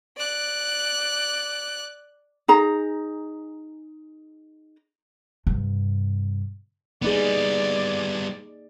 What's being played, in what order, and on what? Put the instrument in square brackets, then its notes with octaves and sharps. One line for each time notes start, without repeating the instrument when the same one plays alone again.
[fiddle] D5 F#6
[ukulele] D#4 G#4 A#5
[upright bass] G2 C3
[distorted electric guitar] G3 B3 [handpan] A#3 D#4 G#4 [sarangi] D5